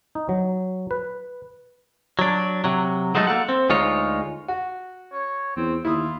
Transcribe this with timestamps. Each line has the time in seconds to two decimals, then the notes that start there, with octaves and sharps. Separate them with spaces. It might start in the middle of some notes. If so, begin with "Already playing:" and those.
0.15 D#4
0.29 F#3
0.91 B4
2.19 F#3 D4
2.64 C3 F#3
3.15 F#3 G#3 A3 D#4 A4
3.27 A#3 A4 F#5
3.49 C4
3.69 D2 G#3 D#4 F4 C#5
4.48 F#4
5.13 C#5
5.57 E2 C4
5.85 D#2 E4 F4 D#6